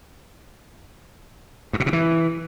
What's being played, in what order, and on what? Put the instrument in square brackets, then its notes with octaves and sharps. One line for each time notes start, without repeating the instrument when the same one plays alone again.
[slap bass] G2
B2
C3
E3